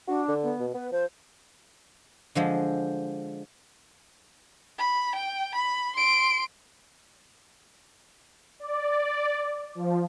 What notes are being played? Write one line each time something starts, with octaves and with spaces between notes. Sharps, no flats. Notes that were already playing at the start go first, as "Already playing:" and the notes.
D4 F#4
D3
B3
B2
B3 B4
F3 C5
D3 F3 G#3
B5
G5
B5
C6 D7
D5
F3